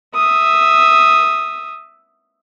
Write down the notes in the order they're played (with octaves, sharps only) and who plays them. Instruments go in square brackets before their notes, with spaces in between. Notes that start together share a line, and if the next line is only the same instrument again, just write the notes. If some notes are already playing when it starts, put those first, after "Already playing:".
[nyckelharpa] E5 D#6